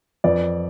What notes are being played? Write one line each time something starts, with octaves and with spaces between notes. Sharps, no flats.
F2 B4 D5